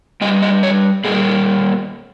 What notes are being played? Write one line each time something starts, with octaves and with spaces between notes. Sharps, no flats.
G2 G3 D#5
D#5
C#5
A#2 G3 A#3 G#4